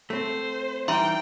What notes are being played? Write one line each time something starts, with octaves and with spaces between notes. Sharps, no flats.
A3 C4 C5
E3 G3 D#4 E5 G5 A#5 C6